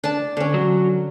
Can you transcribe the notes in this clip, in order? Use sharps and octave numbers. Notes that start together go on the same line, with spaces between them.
D4 D5 A5
D3 C#4
F#3